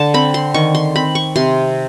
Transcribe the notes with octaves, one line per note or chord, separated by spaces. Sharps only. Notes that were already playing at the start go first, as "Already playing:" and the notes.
Already playing: D3 A5
C4 B5
C6
D#3 C#6
C6
C4 B5
C#6
C3 C6